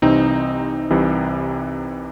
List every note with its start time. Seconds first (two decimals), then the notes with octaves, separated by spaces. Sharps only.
0.02 C2 C3 E3 C4 D#4
0.90 C2 C3 E3